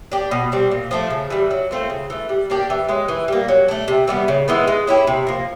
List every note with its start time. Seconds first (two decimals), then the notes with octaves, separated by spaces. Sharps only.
0.12 D4 G4
0.31 B2
0.52 G3 C4
0.71 A#2
0.91 F3 A3 D4
1.10 C#3
1.30 E3 G3
1.51 F#3
1.71 A3 C4 F4
1.90 C#3
2.10 E3 A3
2.29 G3
2.50 A#3 D4 G4
2.70 E3
2.89 G#3 C#4
3.08 E3
3.28 G3 A#3
3.48 F#3
3.68 A3 D4
3.88 C3
4.08 E3 G3 B3
4.28 C#3
4.48 E3 G#3 B3
4.67 G#3
4.87 C#4 E4 G4
5.07 C3
5.27 F3 A#3